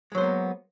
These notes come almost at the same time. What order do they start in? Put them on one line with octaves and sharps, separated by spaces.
G#3 F#3 C5 B3 A#3